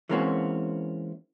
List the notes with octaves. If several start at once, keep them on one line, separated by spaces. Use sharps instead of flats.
E3 G#3 A#3 C4 C#4 F#4